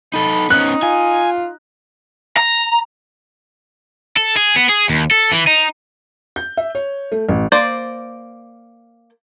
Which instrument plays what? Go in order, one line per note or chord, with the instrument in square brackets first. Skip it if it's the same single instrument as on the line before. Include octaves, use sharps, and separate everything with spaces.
[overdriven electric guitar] D#4 A4 [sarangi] B5
[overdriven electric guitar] B3 C#4 [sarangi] D#4 [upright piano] F#6
[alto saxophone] F4 [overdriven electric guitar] G#5
[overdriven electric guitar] A#5
A4
G#4
B3
G#4
D#2
A4
E3
D#4
[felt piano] G6
E5
C#5
A3
A1
[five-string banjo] A#3 C5 D5